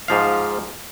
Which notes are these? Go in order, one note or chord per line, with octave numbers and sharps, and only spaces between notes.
G#2 F3 F5